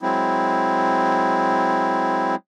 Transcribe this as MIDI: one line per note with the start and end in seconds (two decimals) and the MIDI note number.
0.02 2.35 54
0.02 2.35 56
0.02 2.35 60
0.02 2.35 64